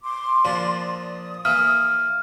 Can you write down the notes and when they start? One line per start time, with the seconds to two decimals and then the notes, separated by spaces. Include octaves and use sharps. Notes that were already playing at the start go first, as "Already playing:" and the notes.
0.04 C6 D6
0.45 A#2 F3 D4
0.80 D#6
1.45 E3 A#3 F6